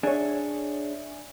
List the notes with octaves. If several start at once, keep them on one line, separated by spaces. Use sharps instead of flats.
D4 G#4 C#5 E5 G#5